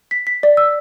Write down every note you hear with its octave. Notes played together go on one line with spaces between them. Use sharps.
B6
B6
D5
E6